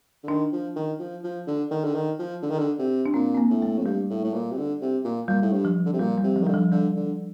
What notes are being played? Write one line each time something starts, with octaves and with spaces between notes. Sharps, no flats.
D3
D#3 D4
F3
D#3
F3
F3
D3
D#3
D3
D#3
F3
D3
D#3
D3
C3
D4
A#2 C4
C4
A#3
A2
A3
F2
G2 G3
A2
A2
A#2
C3
D3
C3
A#2
A#2 G3
A2
G2
F3
D3
C3
A#2 G3
G3
C3
F3
D#3
D3 G3
F3
D3 G3
D3